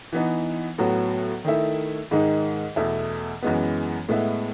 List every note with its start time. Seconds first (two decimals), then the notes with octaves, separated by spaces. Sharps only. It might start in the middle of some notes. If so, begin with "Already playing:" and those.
0.13 E3 B3 D#4
0.78 A2 F#3 B3 F#4
1.45 D#3 A3 E4
2.11 G#2 D#3 G#3 D#4
2.76 E2 B2 A3 E4
3.43 F#2 E3 G#3 B3
4.09 A2 G#3 B3 E4